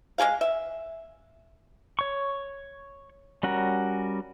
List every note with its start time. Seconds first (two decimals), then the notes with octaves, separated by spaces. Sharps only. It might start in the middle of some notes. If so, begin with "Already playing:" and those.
0.18 G#3 D4 G#4 F5
0.41 E5
1.99 C#5 C#6
3.43 G3 C#4 F#4 A#4